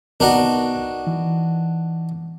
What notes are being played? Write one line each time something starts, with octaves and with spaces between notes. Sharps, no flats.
C2 B3 D4 D#4 F#4 A#4
E3